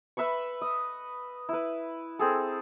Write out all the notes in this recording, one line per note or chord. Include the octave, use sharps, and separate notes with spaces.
B4 E5 B5 C#6
D#5
E4 B4
C4 G#4 A4